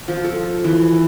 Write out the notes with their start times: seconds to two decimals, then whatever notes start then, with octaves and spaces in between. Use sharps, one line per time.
0.08 F3
0.24 A4
0.64 E3